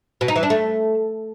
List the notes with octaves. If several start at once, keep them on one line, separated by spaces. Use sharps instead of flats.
B2
D#4
E3
D4
A3